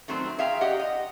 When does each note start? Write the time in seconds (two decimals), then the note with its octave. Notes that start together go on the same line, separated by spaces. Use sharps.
0.08 D#3 F#3 A3 C4 C5
0.39 G#4 E5 F5 G5 A#5
0.61 G4 D#5 F#5
0.79 D#5